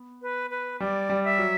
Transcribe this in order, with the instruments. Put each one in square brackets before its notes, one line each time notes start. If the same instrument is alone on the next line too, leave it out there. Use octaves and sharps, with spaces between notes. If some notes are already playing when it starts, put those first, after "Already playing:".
Already playing: [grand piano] B3
[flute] B4
B4
[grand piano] G3 [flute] D5
[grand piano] G3
[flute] E5
[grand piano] F#3